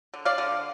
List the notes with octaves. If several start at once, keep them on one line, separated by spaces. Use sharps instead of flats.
D3
D5 F5
D3